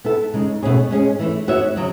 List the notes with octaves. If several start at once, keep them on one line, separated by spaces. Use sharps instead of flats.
B3 E4 A4
C#3 G#3 D#4
B2 A3 C#4 G#4 C#5
G#3 C#4 G#4
E3 A3 E4
B3 F#4 C#5 E5
C#3 F#3